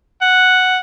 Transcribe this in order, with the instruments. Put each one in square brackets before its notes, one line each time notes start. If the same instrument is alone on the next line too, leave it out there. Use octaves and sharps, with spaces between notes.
[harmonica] F#5